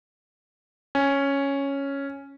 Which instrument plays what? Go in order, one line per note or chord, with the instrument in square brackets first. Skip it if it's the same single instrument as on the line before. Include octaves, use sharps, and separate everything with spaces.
[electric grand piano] C#4